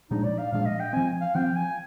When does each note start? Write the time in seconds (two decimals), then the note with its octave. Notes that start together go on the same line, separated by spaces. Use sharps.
0.10 A#2 F3 G#3 D4 D#4
0.24 D5
0.38 F5
0.52 A#2 F3 G#3 D4 F5
0.66 D#5
0.79 G5
0.93 F3 C4 G#5
1.21 F5
1.35 F3 C4 G5
1.56 G#5